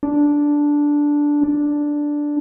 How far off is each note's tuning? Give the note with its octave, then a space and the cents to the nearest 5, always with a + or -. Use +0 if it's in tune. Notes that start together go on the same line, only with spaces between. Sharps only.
D4 -5
D4 +0